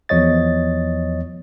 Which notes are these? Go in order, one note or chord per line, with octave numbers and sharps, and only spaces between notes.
E2 F3 C#5 D#5 A6